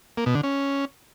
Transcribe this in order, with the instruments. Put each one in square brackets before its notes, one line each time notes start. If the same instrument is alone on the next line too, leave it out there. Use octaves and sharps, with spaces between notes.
[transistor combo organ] A#3
B2
D3
C#4